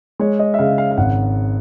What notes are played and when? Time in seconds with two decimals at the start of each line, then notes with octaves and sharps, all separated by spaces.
0.19 G#3 C#5
0.39 D#5
0.54 E5
0.58 C#3 F5
0.78 F5
0.91 F5
0.97 G#1 F#5